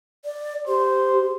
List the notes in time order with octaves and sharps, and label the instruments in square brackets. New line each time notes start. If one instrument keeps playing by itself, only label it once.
[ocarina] D5
[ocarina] G4 [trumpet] C5